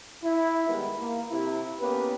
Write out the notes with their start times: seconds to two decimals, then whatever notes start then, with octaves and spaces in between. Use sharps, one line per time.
0.22 E4
0.68 D#3 G3 G#3 B3 A#4 B4
0.99 A#3
1.29 C3 E4
1.79 A#3 B3 C#4 G4 B4